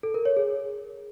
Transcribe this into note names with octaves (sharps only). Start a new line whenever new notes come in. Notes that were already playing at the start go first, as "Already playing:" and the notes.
A4
A#4
C#5
G#4